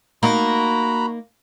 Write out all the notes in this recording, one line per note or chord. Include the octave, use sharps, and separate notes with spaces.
A#3 D#4 F#4 A#5 B5